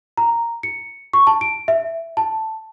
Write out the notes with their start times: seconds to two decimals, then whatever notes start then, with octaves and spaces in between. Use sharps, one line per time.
0.17 A#5
0.63 C#7
1.13 C#6
1.27 A5
1.41 D7
1.68 E5
2.17 A5